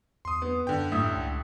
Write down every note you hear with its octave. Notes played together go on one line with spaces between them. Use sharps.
E2 C6 D#6
B3
F#2 D3 G5
A1 E5 D#6
C#2